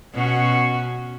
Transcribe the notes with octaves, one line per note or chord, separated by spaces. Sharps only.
B2 C#4 F#4